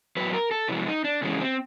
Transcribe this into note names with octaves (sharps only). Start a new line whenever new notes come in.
A2 F#3 B4
A#4
A4
C3 F3 G#3 E4
D#4
D4
C#3 E3 G#3 C#4
C4